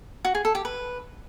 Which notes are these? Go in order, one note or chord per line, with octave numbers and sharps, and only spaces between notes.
F#4
G#4
A4
G4
B4